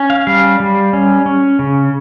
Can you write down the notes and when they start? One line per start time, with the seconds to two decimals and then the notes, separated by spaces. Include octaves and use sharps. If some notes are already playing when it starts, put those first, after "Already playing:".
Already playing: C#4
0.10 F5
0.27 G3 F5
0.60 G3
0.93 C#4
1.26 C#4
1.59 C#3